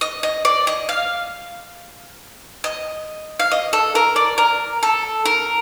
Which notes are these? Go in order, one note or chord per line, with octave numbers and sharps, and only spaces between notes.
D#5
D#5
D5
D#5
F5
D#5
F5
D#5
A4
A#4
D5
A#4
A4
A#4